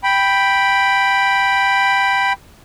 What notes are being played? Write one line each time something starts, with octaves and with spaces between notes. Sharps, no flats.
G5 B5